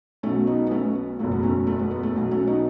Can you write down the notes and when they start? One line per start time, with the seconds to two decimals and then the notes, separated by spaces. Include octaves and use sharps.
0.23 B1 B2 F#3 A3 C#4
0.47 B3 D#4
0.67 B3
0.71 A3 C#4
0.95 B3
1.19 F#1 E2 B2 F#3 A3
1.32 B3
1.43 A3 C#4
1.67 A3
1.79 B3
1.91 B3
2.03 A3
2.15 B1 B2 F#3 B3
2.31 A3 C#4
2.47 B3 D#4